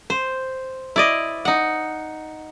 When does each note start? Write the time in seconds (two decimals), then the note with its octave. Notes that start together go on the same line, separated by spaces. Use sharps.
0.10 C5
0.96 E4 D5 D#5
1.45 D#4 F#5